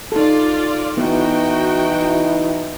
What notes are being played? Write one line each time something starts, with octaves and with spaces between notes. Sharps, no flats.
D#4 F4 A4 D5
E3 B3 D#4 E4 F#4 G5